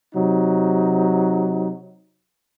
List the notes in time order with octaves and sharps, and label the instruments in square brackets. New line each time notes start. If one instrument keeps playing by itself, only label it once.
[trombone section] C3 F#3 D#4